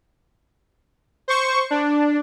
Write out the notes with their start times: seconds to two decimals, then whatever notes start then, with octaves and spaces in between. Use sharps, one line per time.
1.28 C5 C#6
1.71 D4